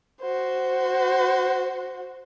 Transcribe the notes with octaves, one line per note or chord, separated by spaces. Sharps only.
F#4 C5